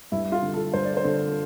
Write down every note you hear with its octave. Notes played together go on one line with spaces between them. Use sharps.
G2 E4
F4
D3
A4
G2 C5
D5
C5
D3